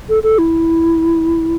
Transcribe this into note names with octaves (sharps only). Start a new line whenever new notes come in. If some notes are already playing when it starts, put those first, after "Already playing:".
A4
A4
E4